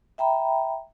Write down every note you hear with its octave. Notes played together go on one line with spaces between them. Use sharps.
E5 G5 A#5 B5